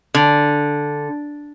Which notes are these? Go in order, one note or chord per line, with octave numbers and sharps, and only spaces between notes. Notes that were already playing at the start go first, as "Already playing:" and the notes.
D3